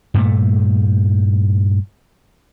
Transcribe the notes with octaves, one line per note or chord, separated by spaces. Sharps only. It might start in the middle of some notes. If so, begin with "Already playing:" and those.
G2 A#2 A3